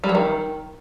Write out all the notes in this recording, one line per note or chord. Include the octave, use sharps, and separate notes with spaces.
G3
F#3
D#3